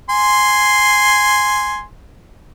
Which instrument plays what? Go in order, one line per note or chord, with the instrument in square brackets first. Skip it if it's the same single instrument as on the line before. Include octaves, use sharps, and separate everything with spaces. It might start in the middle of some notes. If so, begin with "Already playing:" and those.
[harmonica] G#5 C6